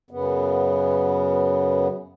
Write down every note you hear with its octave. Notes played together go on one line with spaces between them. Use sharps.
F#2 C#3 B3